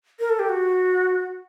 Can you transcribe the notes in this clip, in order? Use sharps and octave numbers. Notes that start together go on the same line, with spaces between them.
A#4
A4
G4
F#4